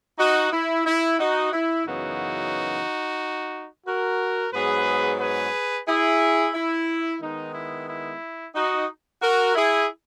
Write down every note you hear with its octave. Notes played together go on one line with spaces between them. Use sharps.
D#4 F#4
E4
E4
D#4 F#4
E4
F#2 C#3 E3 B3 D#4 F#4
F#4 A#4
G#2 F#3 B3 G#4 B4
G#4 B4
E4 G#4
E4
D#3 G#3 B3 D#4
E4
E4
D#4 F#4
F#4 A#4
E4 G#4